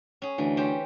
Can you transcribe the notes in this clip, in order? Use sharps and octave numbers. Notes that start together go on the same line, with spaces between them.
C#4 G#4
D2 E3
C#4 G4 C5